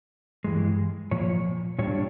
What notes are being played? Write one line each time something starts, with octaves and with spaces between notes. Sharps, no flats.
G2 E3 G#3
A#2 F3 A#3 C#5
A#2 G3 D4 C#5